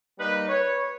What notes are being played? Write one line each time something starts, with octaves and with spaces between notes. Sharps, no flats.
G3 A#3 D#4 B4
B4 C#5